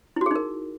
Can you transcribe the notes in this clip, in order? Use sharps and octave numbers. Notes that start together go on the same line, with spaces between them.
D#4 E4 F#4 G#4 A#4